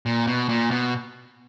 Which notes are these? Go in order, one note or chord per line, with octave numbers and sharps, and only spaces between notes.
A#2
B2
A#2
B2